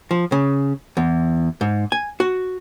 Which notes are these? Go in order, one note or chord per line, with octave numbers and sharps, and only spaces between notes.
F3
C#3
E2
G#2
G#5
F#4